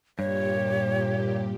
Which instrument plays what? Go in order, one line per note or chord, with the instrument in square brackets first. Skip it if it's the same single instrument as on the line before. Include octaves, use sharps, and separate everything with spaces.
[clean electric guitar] G2 [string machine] A#2 G4 [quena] C#5